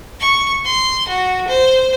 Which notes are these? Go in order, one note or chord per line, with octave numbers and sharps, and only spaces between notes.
C#6
C6
F#4
C5